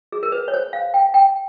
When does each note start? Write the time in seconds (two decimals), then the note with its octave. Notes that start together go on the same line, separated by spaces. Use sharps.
0.12 G#4
0.23 A#4
0.32 B4
0.48 C#5
0.54 C5
0.73 F5
0.94 G5
1.14 G5